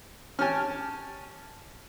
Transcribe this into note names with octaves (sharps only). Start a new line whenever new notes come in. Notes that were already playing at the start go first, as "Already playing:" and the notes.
C#4 G4 G#5 A5 F6